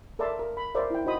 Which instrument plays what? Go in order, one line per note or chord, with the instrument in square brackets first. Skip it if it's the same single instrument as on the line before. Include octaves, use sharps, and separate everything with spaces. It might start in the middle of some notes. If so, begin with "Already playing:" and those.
[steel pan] A4 A#4 D5 E5 A5 C6
A#4
B5
A#4 C5 D5 E5
E4 G5
D#4 F#4 C5 D#5 B5 D#6